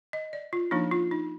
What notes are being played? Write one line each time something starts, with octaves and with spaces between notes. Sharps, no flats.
D#5
D5
F4
F3 A#3 D4 D#4
F4
D#4